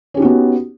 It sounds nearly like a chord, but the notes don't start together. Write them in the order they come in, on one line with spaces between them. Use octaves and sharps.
C#4 G4 D#4 F#4 B3